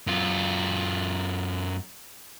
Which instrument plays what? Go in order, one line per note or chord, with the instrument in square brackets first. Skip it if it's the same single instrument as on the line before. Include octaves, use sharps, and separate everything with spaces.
[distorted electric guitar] F#2 F4